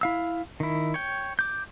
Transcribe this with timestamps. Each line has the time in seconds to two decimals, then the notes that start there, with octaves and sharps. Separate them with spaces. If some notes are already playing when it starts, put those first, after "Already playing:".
0.01 E4 F5 E6
0.60 D#3 E4
0.94 C#5 G5
1.39 D6 G6